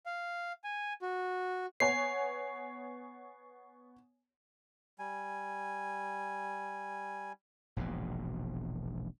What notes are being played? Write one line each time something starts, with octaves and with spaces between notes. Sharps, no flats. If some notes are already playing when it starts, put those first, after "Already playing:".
F5
G#5
F#4
B3 C#5 G#5 C7
G3 G#5
E1 A#1 G#2 B2